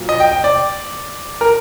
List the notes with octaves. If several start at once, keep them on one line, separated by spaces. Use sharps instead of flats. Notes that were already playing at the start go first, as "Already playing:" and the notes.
Already playing: A#2 F#3
D#5
G5
G5
D5
A#4